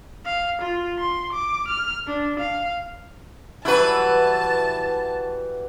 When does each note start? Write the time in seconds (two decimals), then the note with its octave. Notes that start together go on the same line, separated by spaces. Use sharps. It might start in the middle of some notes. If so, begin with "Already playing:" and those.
0.25 F5
0.62 F4
0.99 C6
1.33 D6
1.68 F6
2.07 D4
2.40 F5
3.65 E3 F#3 G3 E4 B4 A5